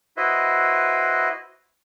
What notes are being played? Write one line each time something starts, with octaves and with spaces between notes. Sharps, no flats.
E4 F#4 B4 C5 D#5 E5